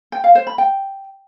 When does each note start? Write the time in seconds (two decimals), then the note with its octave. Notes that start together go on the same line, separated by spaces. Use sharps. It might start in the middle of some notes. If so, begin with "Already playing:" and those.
0.12 G5
0.24 F5
0.35 C5
0.47 B5
0.58 G5